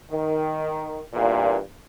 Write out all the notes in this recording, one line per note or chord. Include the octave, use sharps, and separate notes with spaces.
D#3
E2 G2 A#2